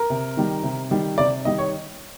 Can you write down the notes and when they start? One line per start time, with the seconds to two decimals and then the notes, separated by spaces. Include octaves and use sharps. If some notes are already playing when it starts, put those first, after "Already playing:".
Already playing: A#4
0.10 C3
0.37 D#3 G3
0.63 C3
0.91 D#3 G3
1.18 C3 D5
1.45 D#3 G3 D#5
1.58 C#5